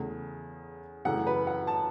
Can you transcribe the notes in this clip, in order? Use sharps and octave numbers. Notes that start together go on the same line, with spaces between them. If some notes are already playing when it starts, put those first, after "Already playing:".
Already playing: E2 C#3 A3
F#2 C#3 E3 A3 F#5
B4
F#5
A5